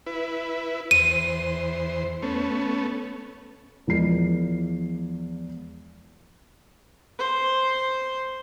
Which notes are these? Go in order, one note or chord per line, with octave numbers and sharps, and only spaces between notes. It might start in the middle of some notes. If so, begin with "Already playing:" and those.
E4 B4
E2 C5 D#7
A3 B3 C#4
E2 F3 G#3 A#4 C7
C5